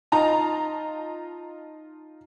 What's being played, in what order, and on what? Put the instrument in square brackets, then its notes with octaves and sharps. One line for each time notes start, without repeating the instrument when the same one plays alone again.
[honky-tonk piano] D#4 F4 A5 A#5